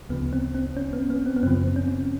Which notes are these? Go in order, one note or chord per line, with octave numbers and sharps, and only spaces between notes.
D2 C#3 F3 B3
C4
C4
C#4
B3
B3
C4
B3
F#2 C#3 F3 C4
C#4